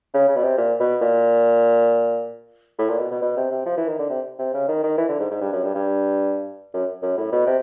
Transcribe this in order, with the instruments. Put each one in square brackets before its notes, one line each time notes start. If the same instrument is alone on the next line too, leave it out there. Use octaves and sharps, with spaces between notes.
[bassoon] C#3
C#3
B2
C3
A#2
B2
A#2
A2
A#2
B2
B2
B2
C3
C3
F3
E3
D#3
D3
C3
C3
C#3
D#3
D#3
E3
D3
G#2
G#2
G2
F#2
G2
G2
F#2
F#2
A2
B2
C3